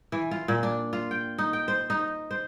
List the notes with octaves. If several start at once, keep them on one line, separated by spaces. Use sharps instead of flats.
E3
F4
A#2
D4
F4
G5
D#4
G5
C5
D#4
C5